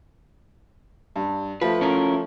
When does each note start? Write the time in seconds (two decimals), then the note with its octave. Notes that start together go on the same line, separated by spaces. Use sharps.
1.16 G2
1.61 F3 A3 B4
1.81 C#4 E4 A#4